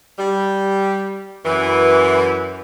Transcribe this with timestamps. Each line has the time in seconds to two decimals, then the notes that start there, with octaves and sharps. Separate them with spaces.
0.18 G3
1.45 F#2 E3